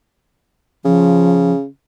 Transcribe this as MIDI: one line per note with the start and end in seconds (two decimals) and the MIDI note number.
0.85 1.66 49
0.85 1.52 53